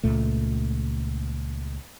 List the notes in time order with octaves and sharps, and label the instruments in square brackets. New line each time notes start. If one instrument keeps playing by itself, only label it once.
[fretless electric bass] C#2 A#2 A3